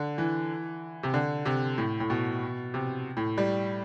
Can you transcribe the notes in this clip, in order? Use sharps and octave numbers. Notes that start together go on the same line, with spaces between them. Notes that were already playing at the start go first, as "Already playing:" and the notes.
Already playing: D3
E3
C3
D3
C3
A2
A2
B2
C3
A2
G3